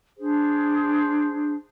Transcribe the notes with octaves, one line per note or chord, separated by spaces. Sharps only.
D4 G#4 C5